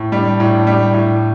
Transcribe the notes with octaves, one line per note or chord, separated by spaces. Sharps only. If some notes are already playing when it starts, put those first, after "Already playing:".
Already playing: A2
G3 D4
A2
G3 D4
A2